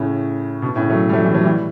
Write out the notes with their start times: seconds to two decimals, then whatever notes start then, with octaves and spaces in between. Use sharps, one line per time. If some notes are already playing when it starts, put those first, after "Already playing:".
Already playing: A2 C#3
0.62 B2 D3
0.76 A2 C#3
0.89 F#3 A3
1.09 G3
1.13 F#3 A3
1.24 E3 G3
1.34 F#3 A3
1.44 E3 G3